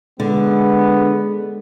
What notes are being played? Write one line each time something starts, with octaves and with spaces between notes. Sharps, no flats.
D3 G#3 B3